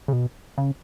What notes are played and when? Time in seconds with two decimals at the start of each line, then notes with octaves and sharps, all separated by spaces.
0.08 C#3
0.13 B2
0.58 C#3